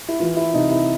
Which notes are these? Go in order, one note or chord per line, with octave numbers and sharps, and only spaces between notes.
E4
E3 F4
E4
C3 D#4
E4